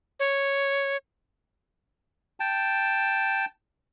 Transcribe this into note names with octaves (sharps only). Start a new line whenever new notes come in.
C#5
G5 A5